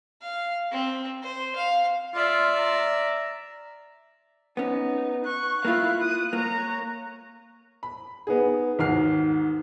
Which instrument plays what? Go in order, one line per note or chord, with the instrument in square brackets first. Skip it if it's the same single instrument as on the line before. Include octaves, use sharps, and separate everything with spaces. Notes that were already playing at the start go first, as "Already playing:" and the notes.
[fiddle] F5
C4
C5
F5
[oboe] F4 [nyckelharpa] D5 E5
[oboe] A#5
[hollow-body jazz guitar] B3 C#4 [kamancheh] D#4
[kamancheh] C#6 [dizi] F#6
[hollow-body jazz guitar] A#3 F4 [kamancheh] E4 F5
[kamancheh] D#6
[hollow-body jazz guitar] A#3 [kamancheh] C#5 A#5
[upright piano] B5
B3 D#4 G#4
D#2 G#2 F#4 F6 C7